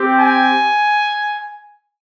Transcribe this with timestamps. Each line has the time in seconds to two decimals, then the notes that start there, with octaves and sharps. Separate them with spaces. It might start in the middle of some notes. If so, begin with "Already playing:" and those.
Already playing: C4 G4
0.18 G#5